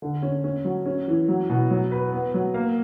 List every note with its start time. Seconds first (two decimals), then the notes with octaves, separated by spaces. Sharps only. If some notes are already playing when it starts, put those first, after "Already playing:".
0.02 D3
0.22 C#4
0.44 C#4
0.65 F#3
0.86 C#4
1.08 E3
1.28 F#3
1.49 B2
1.70 F#3
1.92 B4
2.12 B3
2.34 F#3
2.54 A#3